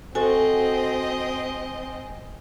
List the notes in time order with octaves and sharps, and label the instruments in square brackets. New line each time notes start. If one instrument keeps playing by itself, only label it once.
[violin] C4 D#5 [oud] F#4 A4 C5 [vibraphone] G#5